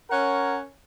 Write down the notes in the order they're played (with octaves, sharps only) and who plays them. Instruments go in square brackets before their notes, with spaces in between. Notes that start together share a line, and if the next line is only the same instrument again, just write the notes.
[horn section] C#4 A#4 C#5 F#5